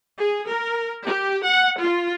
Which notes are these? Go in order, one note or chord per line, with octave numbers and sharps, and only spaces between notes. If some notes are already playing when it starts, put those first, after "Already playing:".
G#4
A#4
G4
F#5
F4